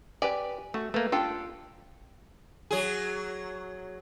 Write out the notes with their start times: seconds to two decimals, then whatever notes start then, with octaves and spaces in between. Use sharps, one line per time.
0.22 G4 B4 D5 G#5
0.74 A3 F#4
0.94 A3 A#3 B4
1.12 D4 F4 G4 A4
2.71 F#3 G#4